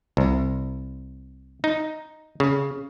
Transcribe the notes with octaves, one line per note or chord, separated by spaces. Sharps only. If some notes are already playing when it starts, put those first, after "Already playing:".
C2
D#4
C#3